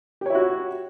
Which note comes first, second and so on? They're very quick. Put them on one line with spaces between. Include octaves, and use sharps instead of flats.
G4 C#5 E4 F#4